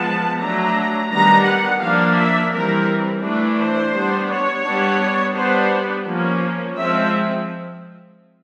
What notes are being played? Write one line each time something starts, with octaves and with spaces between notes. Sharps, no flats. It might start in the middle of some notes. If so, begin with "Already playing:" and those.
Already playing: F3 G#3 B3 A5
F#3 A3 D4 A#5
D#3 G3 B3 D4 A#5
F#5
F3 A#3 D4 F5
E5
E3 G3 C4 A#4
E3 A3 D4
C5
G3 B3 D4
C#5
G3 B3 D4
G3 B3 D4 C5
F3 A#3 C#4
F3 G#3 C4 E5